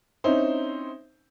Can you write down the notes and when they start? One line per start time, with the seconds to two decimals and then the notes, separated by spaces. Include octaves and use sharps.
0.24 C4 C#4 D#4 E4 C5